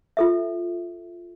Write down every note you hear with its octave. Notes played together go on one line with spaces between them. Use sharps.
F4 A4 E5